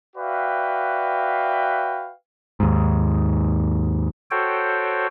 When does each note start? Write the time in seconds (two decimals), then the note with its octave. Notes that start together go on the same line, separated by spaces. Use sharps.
0.16 F#4 B4 D5 E5 F5 G5
2.60 D#2 G#2
4.31 F#4 A4 C5 C#5 G5